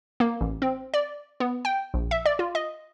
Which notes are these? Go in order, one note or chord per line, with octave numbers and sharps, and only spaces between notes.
A#3
A1
C4
D5
B3
G5
A#1
E5
D5
F4
D#5